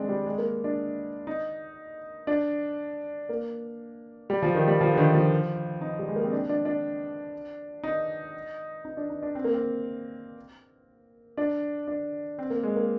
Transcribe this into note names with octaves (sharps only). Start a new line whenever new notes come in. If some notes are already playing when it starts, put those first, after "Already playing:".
Already playing: G#3 C4 D4
G3
G#3
A#3
D4
D#4
D4
A#3
G3
F3
D#3
G3
F3
D3
D#3
F3
D#4
G3
G#3
A#3
C4
D4
D4
D4
D#4
D#4
D4
D#4
D4
C4
A#3
C4
D4
D4
C4
A#3
G#3
A#3